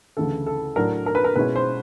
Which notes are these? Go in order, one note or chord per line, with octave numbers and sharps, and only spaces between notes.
D2 C#3 E3 A3 A4
A4
A2 F#3 A3 D4 A#4
A#4
B4
A#4
B2 G#3 C#4 E4 B4
C5